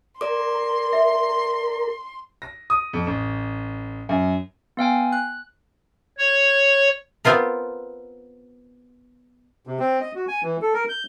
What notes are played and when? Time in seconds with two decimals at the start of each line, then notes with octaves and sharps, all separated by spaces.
0.21 A#4 D5 C6 D6
0.93 E5
2.42 A#6
2.70 D#6
2.93 F2
3.07 A1
4.09 F#2
4.77 B3 F5 G5 G#5
5.13 F#6
6.18 C#5
7.25 B3 C4 F4 A#4
9.67 C3
9.80 C4
10.01 D#5
10.15 F#4
10.28 G#5
10.43 E3
10.62 A4
10.74 A#4
10.89 G6